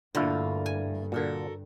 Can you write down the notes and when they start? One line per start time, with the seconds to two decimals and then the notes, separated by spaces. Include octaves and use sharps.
0.15 D2 G2 A#2 D3 A#3 E4 F4
0.66 G#5
1.12 A#2 D3 F#4 A4 A#4